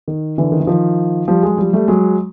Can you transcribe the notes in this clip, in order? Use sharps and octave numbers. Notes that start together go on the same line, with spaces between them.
D#3
D3 E3
D#3
E3
D#3 F3
F3 G3
F#3 G#3
F3 G3
G3 A3
F#3 G#3